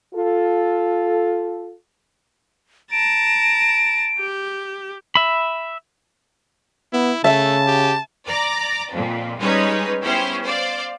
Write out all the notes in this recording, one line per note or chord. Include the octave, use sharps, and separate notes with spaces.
F4 A4
A5 A#5 D7
G4
E5 B5
B3 E4
C#3 A3 E5 A5
G4
D5 A#5 D6
F2 A#2
G3 G#3 C#4 D#4 B4 C#5
B3 C#4 E4 G4 C5
C5 D5 F5